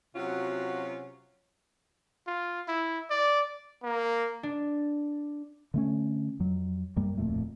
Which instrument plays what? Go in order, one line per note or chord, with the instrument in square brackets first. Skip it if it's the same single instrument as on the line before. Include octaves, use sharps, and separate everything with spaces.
[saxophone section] C3 F#3 C#4 F4 F#4
[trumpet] F4
E4
D5
A#3
[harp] D4
[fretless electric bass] D3 A3 C#4
F2 F#3
F#2 G3 A#3
D1 F2 A#2 A3